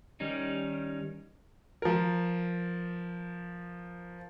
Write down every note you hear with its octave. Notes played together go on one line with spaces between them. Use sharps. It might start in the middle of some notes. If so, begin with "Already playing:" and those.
D#3 G3 C#4 D#4
F3 A#4